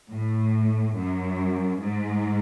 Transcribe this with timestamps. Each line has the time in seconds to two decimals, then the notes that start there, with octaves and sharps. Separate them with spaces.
0.10 A2
0.95 F#2
1.79 G#2